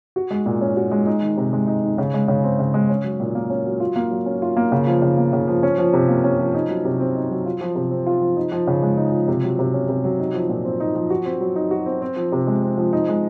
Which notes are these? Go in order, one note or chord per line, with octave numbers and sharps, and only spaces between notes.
F#4
G#3
A#2
C#4
F#4
G#3
D#4
D#3
C3
G#3
D#4
D#3
C#3
G#3
C#3
C4
C#3
G#3
C#4
F#3
A#2
A#3
C#4
F#3
F4
A#3
F#3
C#4
F4
A#3
C#3
F3
C#3
A#3
C#3
F3
C#4
F3
C3
A#3
C#4
F3
D#4
F#3
C3
C4
D#4
F#3
F4
F3
C3
C4
F4
F3
D#4
F3
C#3
G#3
D#4
F3
C3
F#3
C3
C#4
C3
F#3
D#4
F3
A#2
C4
D#4
F3
F#4
C4
F#3
D#4
F#4
C4
C4
F3
C3
G#3
C4
F3
D#4
G#3